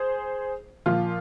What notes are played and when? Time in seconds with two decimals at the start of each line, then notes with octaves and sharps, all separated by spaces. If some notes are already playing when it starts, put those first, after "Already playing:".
Already playing: G#4 C5
0.86 A#2 F3 F4